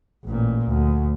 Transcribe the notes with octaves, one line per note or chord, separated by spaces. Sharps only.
A1 A#2
D2